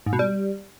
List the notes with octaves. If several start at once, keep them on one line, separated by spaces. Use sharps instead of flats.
G#2
B2
G3